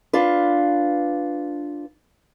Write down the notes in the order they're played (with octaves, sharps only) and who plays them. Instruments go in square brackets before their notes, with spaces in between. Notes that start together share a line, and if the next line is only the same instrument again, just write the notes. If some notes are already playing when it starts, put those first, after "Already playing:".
[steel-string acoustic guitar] D4 F4 B4